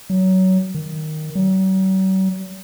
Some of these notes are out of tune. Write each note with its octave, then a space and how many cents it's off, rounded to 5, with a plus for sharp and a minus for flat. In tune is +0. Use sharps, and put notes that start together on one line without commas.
F#3 +20
D#3 -5
F#3 +45